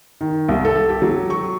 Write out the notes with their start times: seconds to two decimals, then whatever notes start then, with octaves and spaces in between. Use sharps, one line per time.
0.21 D#3
0.49 C2
0.65 A4
0.89 G4
1.02 F#3
1.30 C#6